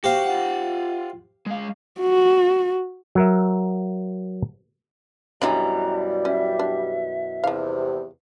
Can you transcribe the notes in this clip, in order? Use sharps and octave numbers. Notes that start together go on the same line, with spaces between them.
F#4 G4 C5 F5
F4 F#5
G#3 F5
F#4
F#3 A#4 E5
F#2 B2 E3 G3 D4 E4 G#4 A#5
C#4 E5
D4
E2 G2 C3 F3 F5